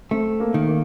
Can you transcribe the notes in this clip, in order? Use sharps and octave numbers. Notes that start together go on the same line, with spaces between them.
A3 C4
A#3
D#3
A#3